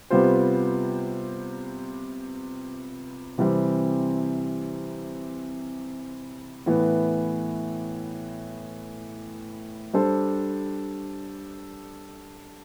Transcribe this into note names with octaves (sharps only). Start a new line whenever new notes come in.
C3 G3 B3 F4 C5
C3 E3 G3 C4
A2 E3 B3
G3 D4 A4 C5